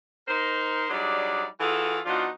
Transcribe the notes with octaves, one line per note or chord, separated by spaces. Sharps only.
D#4 A#4 C5
F#3 G3 D4 D#4 G#4 D5
E3 F4 F#4 G#4 A4
F3 B3 D4 D#4 F4 F#4